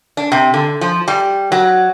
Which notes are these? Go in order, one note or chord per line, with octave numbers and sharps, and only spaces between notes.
D4
C3
D3
F3
G3
F#3